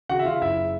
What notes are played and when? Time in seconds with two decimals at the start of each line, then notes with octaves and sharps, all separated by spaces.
0.09 C#3 F#4 F#5
0.19 E5
0.26 C#3 F4 F5
0.41 F#1 E4 E5